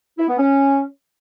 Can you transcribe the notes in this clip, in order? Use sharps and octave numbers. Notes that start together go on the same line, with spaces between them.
E4
B3
C#4